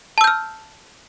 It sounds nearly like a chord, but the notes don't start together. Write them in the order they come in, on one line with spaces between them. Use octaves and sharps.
A5 E6 G6 F6